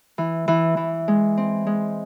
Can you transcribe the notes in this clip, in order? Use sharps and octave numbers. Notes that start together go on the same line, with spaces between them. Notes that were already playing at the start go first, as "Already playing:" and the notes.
E3
E3
E3
G#3
C4
G#3